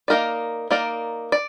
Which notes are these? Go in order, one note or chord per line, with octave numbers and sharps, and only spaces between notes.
A#3 D#4 A#4 D5
A#3 D#4 A#4 D5
D5